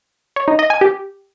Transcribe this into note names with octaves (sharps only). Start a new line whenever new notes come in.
C#5
D#4
D#5
G#5
G4